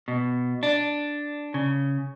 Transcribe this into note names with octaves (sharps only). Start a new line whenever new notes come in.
B2
D4
C#3